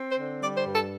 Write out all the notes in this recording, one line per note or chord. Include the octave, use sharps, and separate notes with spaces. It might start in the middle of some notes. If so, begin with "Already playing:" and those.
Already playing: C4
C5
D3
G3 D5
C5
G2
A4